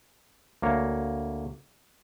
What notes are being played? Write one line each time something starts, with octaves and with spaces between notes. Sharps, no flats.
D2 A#3 C#5